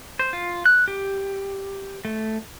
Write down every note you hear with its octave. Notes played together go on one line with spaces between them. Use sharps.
C5
F4
F#6
G4
A3